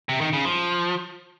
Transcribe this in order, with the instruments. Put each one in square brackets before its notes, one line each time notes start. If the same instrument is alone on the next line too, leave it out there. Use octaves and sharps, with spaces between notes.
[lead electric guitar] C3
D#3
C#3
F3